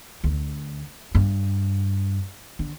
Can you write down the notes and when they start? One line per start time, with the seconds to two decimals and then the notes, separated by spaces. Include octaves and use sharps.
0.24 D2
1.15 G2
2.59 D3